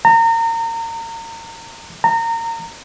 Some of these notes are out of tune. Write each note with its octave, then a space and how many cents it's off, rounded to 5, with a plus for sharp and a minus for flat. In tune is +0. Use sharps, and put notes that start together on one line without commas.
A#5 -30
A#5 -25